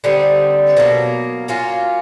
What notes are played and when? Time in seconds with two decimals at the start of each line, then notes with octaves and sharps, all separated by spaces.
0.04 D3 G3 C4 D#4
0.77 B2 F#3 A#3
1.48 F#3 A#3 C#4 F4